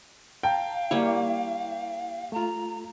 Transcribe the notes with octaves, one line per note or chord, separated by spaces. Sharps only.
F5 G5 A5 A#5
G3 A#3 E4 C#5
A3 F4 A#5